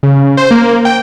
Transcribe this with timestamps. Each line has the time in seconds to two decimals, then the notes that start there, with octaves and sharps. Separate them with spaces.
0.03 C#3
0.37 C5
0.51 A#3
0.85 G5